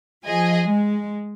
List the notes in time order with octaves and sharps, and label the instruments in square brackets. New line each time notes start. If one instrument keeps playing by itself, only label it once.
[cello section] F3 [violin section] G#4 D#5 G#5
[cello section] G#3